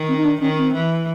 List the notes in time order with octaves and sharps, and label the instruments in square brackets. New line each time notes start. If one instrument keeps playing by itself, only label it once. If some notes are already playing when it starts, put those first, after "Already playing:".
Already playing: [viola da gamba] D#3
[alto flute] C4
D#4
D4
[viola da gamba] D#3 [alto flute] C#4
[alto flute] C4
[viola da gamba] E3